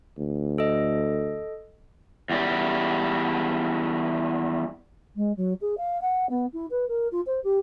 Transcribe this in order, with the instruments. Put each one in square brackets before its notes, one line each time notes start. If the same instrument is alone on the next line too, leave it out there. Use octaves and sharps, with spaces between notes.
[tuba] D2
[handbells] A4 D#5
[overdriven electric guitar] E2 G3
[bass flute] G#3
F#3
G#4
F5
F#5
B3
E4
B4
A#4
F4
C5
G4